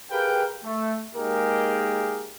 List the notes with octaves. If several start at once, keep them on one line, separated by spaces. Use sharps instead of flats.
G4 G#4 A#4 B4 F5 G5
A3
G#3 A#3 D#4 G4 G#4 A#4